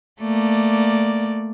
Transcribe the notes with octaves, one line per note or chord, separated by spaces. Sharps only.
A3 A#3 D5